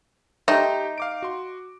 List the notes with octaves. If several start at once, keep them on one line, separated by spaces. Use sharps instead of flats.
A3 D#4 G4 G5 C6
F5 D6 D7
F#4 C6